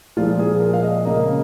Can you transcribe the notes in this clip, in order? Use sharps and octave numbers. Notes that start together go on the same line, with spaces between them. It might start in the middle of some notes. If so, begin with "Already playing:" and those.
A#2 F3 G#3 F4
G#4
A#4
F5
D#5
C#3 A#3 D#5